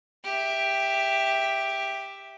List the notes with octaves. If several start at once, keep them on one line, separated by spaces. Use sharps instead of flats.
G4 E5